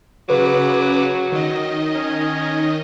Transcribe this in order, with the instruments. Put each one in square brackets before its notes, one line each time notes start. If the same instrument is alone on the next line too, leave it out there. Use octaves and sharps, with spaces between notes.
[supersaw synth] C#3 B4 D6 [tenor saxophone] F#3
[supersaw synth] D#3 D#5
[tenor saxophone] C#4